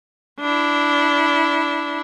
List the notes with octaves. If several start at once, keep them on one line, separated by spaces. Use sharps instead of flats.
D4 E4